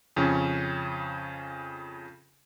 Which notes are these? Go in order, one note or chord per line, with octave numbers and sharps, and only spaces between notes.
F2 C#3 C#4